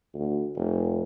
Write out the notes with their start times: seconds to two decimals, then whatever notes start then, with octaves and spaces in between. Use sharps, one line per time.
0.15 D2
0.56 F1